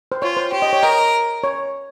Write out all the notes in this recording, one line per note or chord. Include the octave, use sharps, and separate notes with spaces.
C5
F4 C#5
C5
G4 C#5
D#5
C#5
A#4 D#5
C#5